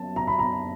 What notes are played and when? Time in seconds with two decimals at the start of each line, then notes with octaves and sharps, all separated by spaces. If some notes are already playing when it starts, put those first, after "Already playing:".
Already playing: F#2 A5
0.16 A#5
0.27 B5
0.39 A#5